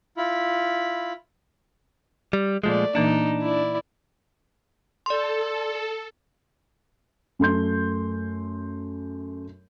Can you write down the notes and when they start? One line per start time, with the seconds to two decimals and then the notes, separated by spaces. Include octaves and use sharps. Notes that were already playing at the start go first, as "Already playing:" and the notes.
0.17 E4 F4 B5
2.33 G3
2.64 A#2 F3 G#3 A3 D5
2.95 A#2 E3 A#3 D4 D#4
3.42 E4 D5
5.06 A4 D5 C6
7.39 F#2 A3 C6 G6